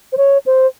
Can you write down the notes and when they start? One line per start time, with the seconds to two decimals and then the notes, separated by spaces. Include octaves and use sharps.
0.12 C5
0.17 C#5
0.46 C5